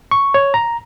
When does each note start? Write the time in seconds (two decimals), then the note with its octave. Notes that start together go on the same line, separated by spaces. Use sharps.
0.11 C#6
0.34 C#5
0.54 A#5